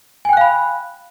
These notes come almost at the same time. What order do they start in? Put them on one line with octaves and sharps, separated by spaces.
G#5 G5 F#6 F5 B5